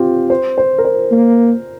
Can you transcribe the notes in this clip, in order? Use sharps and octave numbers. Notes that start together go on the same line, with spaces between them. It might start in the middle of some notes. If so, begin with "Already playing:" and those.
Already playing: C4 F4 G4
C5
C5
A#4
C5
A#3